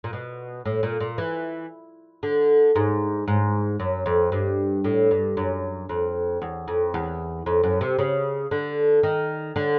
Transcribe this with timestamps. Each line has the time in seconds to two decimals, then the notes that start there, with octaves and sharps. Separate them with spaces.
0.04 A#2
0.13 B2
0.65 A2
0.83 A#2
1.00 A#2
1.18 E3
2.23 D3
2.76 G#2
3.28 G#2
3.80 F#2
4.06 F2
4.32 G2
4.84 A2
5.11 G2
5.37 F#2
5.89 F2
6.42 E2
6.68 F2
6.94 E2
7.46 F2
7.63 F#2
7.81 C3
7.99 C#3
8.51 D3
9.03 D#3
9.56 D3